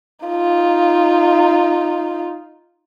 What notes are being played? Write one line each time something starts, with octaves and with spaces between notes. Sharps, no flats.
D#4 F4